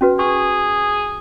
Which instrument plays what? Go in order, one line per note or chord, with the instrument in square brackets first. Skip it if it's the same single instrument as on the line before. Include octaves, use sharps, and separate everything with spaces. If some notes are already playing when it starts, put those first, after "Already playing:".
[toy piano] C#4 F#4 B4
[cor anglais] G#4 [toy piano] C#6